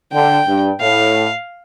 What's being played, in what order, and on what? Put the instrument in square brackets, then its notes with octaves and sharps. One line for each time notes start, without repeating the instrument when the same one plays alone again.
[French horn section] D3 [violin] G5
[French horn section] G2
[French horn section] A2 [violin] F5